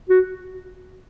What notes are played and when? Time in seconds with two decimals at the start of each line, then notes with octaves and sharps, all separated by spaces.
0.09 F#4